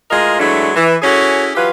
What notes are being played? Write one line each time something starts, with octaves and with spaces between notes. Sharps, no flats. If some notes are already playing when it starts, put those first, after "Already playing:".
A2 G#3 F4 A#4 D#5
E3 F#3 G#3 A3 D4 E4
E3
C#4 E4 F#4 G#4 A4 C#5
E3 F#3 F4 G4 B4